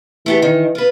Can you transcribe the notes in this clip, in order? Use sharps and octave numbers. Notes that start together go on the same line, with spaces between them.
E3 A3 B3 G4
D#3
F4 B4